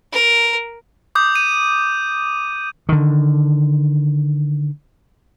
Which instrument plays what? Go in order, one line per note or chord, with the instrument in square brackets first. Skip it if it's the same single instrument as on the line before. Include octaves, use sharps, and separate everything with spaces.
[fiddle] A#4
[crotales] D6 D#6 G6
D#7
[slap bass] D3 D#3